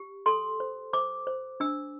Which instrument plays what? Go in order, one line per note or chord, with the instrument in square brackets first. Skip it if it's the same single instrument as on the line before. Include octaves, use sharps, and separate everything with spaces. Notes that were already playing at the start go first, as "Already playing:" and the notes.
Already playing: [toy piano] G4
A4 C6
C5
C5 D6
C5
D4 E6